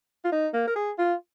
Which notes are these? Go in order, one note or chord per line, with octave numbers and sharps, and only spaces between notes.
F4
D#4
A#3
A#4
G#4
F4